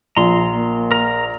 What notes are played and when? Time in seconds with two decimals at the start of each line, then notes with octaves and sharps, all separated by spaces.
0.17 A#1 F3 A#5 C6
0.55 A#3
0.91 A#4 A#5